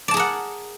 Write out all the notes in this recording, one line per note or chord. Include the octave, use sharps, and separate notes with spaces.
G#4 A#4 D5 F#5 A5